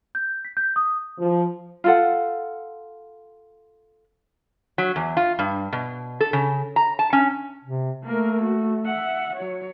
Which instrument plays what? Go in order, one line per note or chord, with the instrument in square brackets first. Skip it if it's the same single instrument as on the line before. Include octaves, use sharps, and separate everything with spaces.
[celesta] G6
B6
G6
D#6
[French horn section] F3
[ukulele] F4 A4 F#5
[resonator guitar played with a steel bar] F#3
E2
F4
G2
B2
A4
C#3
A#5
A5
C#4
[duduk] C3
[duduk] A3 [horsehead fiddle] A#3 A#4
[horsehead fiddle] F#4
E5 F#5
F#3 C#5